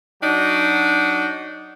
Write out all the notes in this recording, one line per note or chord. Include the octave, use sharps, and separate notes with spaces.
F#3 D4 D#4 F#4